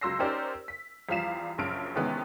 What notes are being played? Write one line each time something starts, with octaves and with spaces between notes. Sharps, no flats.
C#2 F#3 C6 E6 A#6 C7
C#4 D#4 G4 A#4 C5 D5
B6
E2 F3 G3 F5 B6 E7
A#1 F#2 C#3 A5 F6 D7
C3 D#3 E3 G#3 B3 C#4